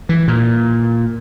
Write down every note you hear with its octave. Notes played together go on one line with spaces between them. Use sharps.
E3
A#2